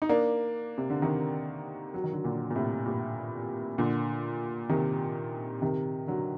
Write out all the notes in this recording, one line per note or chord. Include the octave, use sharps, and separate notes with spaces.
D#4
A#3 D4
C3
D3
C3 D#3
F#3
D#3
D3 F#3
A#2 D3
A#2
A2 C3
G2 A#2
A#2 D3
C3 D#3
C3 D#3
D3 F#3